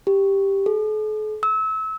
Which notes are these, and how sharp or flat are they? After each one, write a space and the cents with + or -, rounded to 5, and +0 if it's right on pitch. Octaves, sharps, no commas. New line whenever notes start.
G4 +0
A4 -45
E6 -30